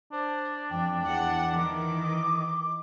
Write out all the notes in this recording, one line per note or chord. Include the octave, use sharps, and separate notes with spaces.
D4 C5
F2 G5
E2 F#5
D#3 E3 D6
D#5